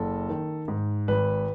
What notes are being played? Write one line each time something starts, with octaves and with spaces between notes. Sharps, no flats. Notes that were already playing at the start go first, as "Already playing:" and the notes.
Already playing: F#1 A4
D#3
G#2
G#1 B4